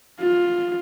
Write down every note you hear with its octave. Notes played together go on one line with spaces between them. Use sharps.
F4